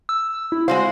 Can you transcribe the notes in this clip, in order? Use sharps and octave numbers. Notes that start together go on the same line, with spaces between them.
E6
E4
G#3 F#4 C5 F5